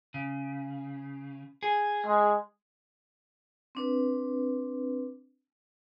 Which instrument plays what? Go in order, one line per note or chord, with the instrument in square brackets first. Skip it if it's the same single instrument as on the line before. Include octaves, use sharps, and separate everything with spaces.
[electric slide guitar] C#3
G#4
[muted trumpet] G#3
[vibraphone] C4 D4 B4